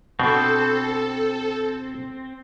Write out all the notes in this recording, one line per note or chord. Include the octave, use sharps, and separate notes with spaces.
B2 C4 D4 A4